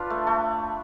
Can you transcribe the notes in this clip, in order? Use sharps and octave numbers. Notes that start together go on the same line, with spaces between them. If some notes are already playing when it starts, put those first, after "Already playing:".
Already playing: D4 F4 B4
A3
A3